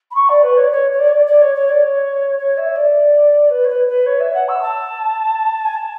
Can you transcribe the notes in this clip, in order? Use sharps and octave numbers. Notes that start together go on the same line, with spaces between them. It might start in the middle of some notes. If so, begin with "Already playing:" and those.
B5
C#6
D5
B4
C#5
D5
C#5
C#5
D5
C#5
D5
D5
C#5
C#5
D5
C#5
C#5
E5
D5
B4
C#5
B4
B4
C#5
E5
F#5
E6
A5
G#5
A5